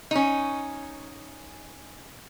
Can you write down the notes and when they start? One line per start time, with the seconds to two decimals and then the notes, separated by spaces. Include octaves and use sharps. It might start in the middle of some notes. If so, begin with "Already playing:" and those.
0.11 C#4 D#4